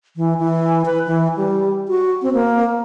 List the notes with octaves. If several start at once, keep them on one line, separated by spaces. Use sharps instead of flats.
E3
E3
B4
E3
G3
F#4
C4
A#3